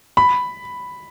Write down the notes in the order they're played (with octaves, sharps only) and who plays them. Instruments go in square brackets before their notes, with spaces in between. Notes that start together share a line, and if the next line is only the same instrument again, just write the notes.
[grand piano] B5